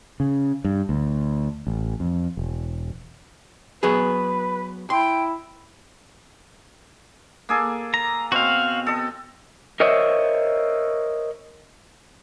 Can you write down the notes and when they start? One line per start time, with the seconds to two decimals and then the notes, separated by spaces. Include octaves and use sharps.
0.20 C#3
0.65 G2
0.89 D2
1.67 A1
2.00 F2
2.37 E1
3.83 F#3 B3 G#4 B4
4.90 E4 G5 C6
7.49 A#3 G#4 A4
7.94 A#5
8.32 B2 C4 F#4 F5
8.87 A4 D#5
9.80 A#4 C5 C#5 D#5 E5